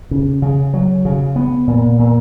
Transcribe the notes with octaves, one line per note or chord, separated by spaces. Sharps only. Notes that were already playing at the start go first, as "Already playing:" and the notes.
C#3
C#3
F#3
C#3
B3
A#2
A#2